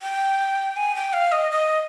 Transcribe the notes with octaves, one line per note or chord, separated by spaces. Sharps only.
G5
G#5
G5
F5
D#5
D#5